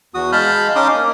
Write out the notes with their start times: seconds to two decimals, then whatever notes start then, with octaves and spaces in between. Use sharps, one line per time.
0.14 E2 F#4 D#6
0.32 G#3 F5 A5 B5 F6 G6
0.76 C#4 D#4 C6 D6 D#6
0.94 A#3